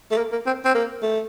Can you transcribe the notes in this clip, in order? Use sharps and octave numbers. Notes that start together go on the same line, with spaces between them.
A3
A#3
A#3
C4
C4
A#3
A3